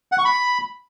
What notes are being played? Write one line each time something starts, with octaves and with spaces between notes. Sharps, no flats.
F#5
C#6
B5